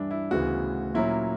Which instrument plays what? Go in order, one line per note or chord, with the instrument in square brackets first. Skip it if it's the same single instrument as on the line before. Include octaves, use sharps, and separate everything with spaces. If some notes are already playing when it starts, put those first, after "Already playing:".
Already playing: [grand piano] G2 E3 G3 D4 E4
E4
D2 C#3 E3 B3 F#4
A#2 F#3 A#3 C#4 E4